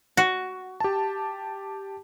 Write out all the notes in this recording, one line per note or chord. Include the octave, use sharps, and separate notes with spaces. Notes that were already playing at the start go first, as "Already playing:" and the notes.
F#4
G4 A5